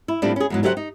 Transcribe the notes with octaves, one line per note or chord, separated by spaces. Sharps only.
E4
A2 F3 G3 C4 D4
C#4 G#4
E2 G#2 F#3
D3 F#3 G4 C5 E5 F#5
D#4